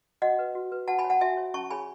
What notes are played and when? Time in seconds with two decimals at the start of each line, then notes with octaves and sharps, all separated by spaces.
0.22 F#4 D#5 F#5
0.39 B4
0.55 F#4
0.72 B4
0.88 F#4 F#5 A5
0.99 G#5 B5
1.04 C#5
1.10 F#5 A5
1.21 F#4 E5 G#5
1.37 C#5
1.54 C#4 A5 C#6
1.70 G#4 C#5 G#5 B5